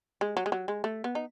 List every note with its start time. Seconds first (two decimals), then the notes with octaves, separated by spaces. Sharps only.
0.21 G#3
0.37 F#3
0.46 G#3
0.52 F#3
0.68 G#3
0.84 A3
1.04 B3
1.15 D#4